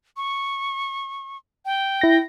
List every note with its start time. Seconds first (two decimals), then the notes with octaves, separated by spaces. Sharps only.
0.17 C#6
1.65 G5
2.01 E4 A#6